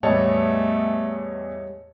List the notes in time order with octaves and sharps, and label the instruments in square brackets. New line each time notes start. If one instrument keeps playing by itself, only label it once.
[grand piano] E2 A2 [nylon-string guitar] G3 [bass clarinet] A3 [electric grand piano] C#5 D#5 A5